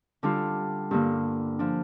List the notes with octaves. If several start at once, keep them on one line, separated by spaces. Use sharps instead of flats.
D3 G3 D4 F4
G2 D3 A#3
F3 D4